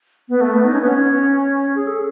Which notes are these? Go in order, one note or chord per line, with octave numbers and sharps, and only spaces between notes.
B3
A3
B3
D#4
C#4
B3
C#4
G#4
A4